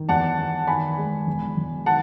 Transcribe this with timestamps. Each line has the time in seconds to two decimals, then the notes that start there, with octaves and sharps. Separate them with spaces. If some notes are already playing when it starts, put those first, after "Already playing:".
Already playing: D#3
0.09 E2 F#5 A5
0.38 E2
0.67 D#3 G#5 B5
0.98 G#3
1.27 E1
1.57 E1
1.86 D#3 F#5 A5